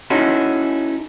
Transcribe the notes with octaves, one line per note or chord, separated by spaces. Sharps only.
C#4 D#4 E4 F#4 A4